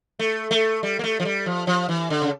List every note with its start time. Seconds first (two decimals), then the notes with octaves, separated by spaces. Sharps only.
0.19 A3
0.51 A3
0.83 G3
0.99 A#3
1.04 A3
1.20 F3
1.25 G3
1.46 F3
1.67 F3
1.89 E3
2.10 D3
2.22 C#3